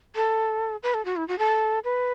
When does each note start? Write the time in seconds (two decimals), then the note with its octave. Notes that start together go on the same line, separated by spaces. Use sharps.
0.15 A4
0.83 B4
0.94 A4
1.05 F#4
1.16 E4
1.28 F#4
1.39 A4
1.84 B4